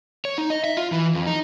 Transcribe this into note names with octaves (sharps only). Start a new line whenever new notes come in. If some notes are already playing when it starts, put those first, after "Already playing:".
C#5
D#4
D#5
E5
F4
E3
F2
D#4